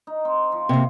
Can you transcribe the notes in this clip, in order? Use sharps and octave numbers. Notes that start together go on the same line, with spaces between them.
D#4
C4
F3
C3 A#3